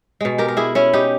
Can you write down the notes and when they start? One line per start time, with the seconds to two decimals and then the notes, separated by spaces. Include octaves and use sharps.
0.21 B2 G#3
0.38 G4 A#4
0.48 A#4
0.57 E4 G#4
0.75 C#4 E4
0.93 D#4 G4